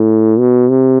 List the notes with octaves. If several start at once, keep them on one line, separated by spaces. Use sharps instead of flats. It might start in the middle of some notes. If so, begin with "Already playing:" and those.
Already playing: A2
B2
C3